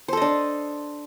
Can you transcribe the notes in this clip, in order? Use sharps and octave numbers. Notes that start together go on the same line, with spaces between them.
D4 A4 C5 D#5